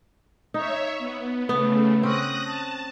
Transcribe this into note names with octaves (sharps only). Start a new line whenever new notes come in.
D#4 C#5 E5
B3
C#3 A3 B3
C4 C#4 D#6 F#6 A#6
A5